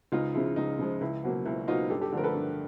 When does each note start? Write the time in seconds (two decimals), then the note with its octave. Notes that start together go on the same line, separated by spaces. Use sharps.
0.12 C#2 D#4 F4
0.34 C#3 F3 G#3 E4
0.56 C#2 D#4
0.79 C#3 F3 G#3
1.01 C#2 E4
1.23 B2 F#3 A#3
1.45 C#2 E4
1.68 B2 F#3 A#3 D#4 F4
1.90 G2 G4 A4
2.01 G4 A4
2.13 D3 F3 A3 A#4
2.24 A4 B4
2.34 G2